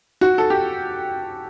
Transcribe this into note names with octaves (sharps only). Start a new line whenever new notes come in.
F#4
A4
G4